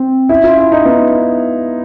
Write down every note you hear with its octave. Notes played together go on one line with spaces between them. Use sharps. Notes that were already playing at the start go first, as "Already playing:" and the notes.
Already playing: C4
C#4 E4
F4
E4
D#4
B3 D#4